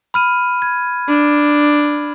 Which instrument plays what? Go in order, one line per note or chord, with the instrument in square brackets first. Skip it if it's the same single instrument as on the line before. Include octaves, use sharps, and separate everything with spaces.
[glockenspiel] B5 F6 D#7
G#6
[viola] D4